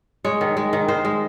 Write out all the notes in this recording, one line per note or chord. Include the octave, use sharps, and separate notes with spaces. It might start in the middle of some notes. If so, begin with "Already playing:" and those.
G#3 C#5
D#3
G#3
D#3
D#3 C5
G#3